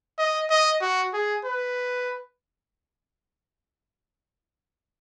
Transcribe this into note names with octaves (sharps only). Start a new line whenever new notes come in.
D#5
D#5
F#4
G#4
B4